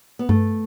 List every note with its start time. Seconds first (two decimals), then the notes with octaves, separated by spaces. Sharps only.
0.19 B3
0.29 G2 A3